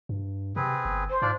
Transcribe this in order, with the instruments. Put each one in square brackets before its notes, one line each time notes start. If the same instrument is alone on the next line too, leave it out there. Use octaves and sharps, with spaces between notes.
[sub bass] G2
[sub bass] C3 [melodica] C4 G#4 B4
[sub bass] G1
[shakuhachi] C5
[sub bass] G#2 [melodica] D4 F4 D5